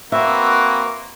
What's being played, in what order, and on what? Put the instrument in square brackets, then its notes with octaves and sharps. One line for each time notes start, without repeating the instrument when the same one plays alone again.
[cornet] A#3 [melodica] C4 F#4 B4 [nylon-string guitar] E5